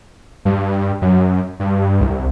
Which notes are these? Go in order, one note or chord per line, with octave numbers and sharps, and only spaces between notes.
G2
F#2
G2
C2